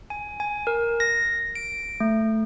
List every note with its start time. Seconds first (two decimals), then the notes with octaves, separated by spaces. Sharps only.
0.10 G#5
0.40 G#5
0.67 A#4
1.00 A#6
1.55 D7
2.00 A3